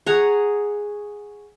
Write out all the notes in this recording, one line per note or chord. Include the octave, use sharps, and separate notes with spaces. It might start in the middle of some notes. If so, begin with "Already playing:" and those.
G#4 C#5 F#5 A#5